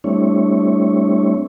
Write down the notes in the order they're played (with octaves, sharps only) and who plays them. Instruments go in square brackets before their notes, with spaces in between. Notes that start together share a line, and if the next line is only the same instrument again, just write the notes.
[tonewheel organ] G3 A3 C4 D4 E4 C#5